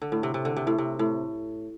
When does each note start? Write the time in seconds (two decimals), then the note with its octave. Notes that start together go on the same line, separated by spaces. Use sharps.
0.02 D3
0.12 A2
0.23 C3
0.34 C3
0.45 D3
0.56 C3
0.67 A2
0.78 C3
0.99 A2